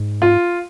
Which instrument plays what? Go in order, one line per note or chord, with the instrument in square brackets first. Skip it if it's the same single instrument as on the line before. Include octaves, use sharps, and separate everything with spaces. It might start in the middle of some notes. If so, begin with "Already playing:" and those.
Already playing: [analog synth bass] G#2
[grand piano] F4